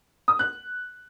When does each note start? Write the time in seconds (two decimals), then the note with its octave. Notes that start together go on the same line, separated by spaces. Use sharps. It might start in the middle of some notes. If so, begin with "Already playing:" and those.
0.28 D#6
0.39 F#6